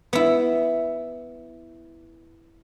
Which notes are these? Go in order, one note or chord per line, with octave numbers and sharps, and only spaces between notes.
B3 E4